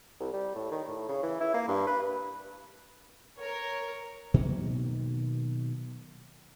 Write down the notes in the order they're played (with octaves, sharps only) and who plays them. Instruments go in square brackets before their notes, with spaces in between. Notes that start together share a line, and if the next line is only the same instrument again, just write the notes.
[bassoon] C2
G3
A2
D#3
A2
C#3
E3
E4
A#3
G2
B4
[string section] A#4 C#5
[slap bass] B2 D#3 F#3 A#3